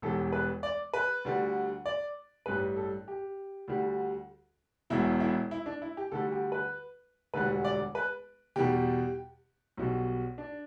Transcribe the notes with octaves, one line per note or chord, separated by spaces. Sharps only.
E1 E2 E3 G3 A4
B4
D5
B4
D2 D3 G3
D5
A1 G2 G3 B4
A4
G4
D2 D3 G3
E1 E2 B2 E4
E4
E4
D4
E4
G4
D2 D3 G3 A4
G4
B4
E1 D2 D3 G3 B4
D5
B4
E2 B2 G3 G4
B1 B2 G3
D4